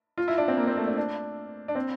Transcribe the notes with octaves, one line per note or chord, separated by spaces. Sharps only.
F4
E4
D4
C4
A#3
C4
A3
D4
D4
D4
C4